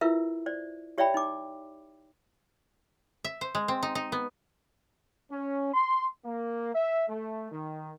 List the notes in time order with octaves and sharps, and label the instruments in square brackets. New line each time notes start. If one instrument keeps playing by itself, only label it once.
[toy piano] E4 F4 A#4 B4 E5
C5 D5
G4 C#5 D5 E5 G5 B5
D#4 D6
[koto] E5
C5
G#3
C4
D#4
D#4
B3
[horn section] C#4
C6
A#3
E5
A3
D#3